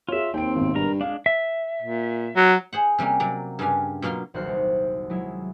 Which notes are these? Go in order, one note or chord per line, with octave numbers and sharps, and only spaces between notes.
F4 G#4 C#5 E5
D#2 C4 G5 D7
G#1 B2
G2 A#4 A#5
G#3 D4 F5
E5
A#2
F#3
G#4 C5 F#5
C3 G3 A#3 C#4
C3 F#3 D5 A#5
G2 C#3 G3 D4 F5 G#5
B2 F#3 A#3 F4 F5 C6
D#1 B1 F#4 C5 F6 F#6
C2
F#3 G#3 E4